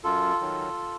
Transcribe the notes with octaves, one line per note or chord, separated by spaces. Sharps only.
F#2 F4 A4
D#3 F#3